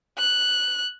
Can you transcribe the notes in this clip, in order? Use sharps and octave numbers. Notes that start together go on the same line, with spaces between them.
F#6